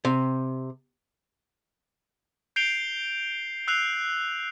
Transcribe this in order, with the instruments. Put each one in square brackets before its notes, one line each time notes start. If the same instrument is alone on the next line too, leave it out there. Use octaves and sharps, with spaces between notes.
[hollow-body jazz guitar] C3
[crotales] G6 C7 D7 F7 G7
E6 F#6 C7 F7